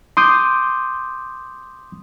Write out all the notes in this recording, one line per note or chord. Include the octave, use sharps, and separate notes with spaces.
C6 D6 D#6 G6